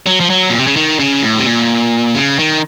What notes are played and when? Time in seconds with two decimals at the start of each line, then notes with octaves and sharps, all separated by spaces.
0.07 F#3
0.20 F3
0.30 F#3
0.50 A#2
0.58 C3
0.67 C#3
0.76 D#3
0.99 C#3
1.23 A2
1.39 C3
1.46 A#2
2.15 C#3
2.39 D#3